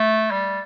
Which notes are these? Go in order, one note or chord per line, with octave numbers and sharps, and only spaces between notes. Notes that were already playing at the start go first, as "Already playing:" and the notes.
Already playing: A3
G3